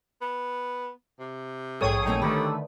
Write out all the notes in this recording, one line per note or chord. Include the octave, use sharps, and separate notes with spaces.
B3
C3
A#1 G#2 G#4 A4 C#5 G5 D#6
A#2 A3 C4 D#4
D3 D#3 G3 A3 B4